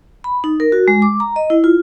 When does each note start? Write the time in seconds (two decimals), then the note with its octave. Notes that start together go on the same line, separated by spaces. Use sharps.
0.24 B5
0.44 D#4
0.60 A#4
0.72 F#4
0.88 G#3
1.02 D6
1.20 A#5
1.36 D#5
1.50 E4
1.64 F4